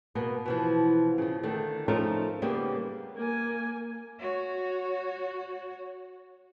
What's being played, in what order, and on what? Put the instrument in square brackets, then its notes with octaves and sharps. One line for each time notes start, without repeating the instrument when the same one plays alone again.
[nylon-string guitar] B2 A#3 B3
B2 E3 F3
C#3 F3
D3 D#3 A3
F3 A3 C#4 D#4 F4 A#4
C#3 G3 A#3 B3
[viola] A#3 G#5
[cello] F#4 C#5